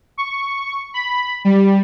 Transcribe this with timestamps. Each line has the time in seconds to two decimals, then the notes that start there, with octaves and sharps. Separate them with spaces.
0.18 C#6
0.94 B5
1.45 G3